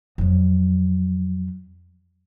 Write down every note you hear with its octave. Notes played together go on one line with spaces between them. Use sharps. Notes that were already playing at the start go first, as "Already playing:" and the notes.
F2 F#3